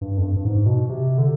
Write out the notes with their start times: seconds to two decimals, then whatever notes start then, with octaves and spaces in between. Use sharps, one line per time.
0.01 G2
0.18 F2
0.22 G2
0.36 G2
0.45 G#2
0.66 B2
0.89 C3
1.18 D3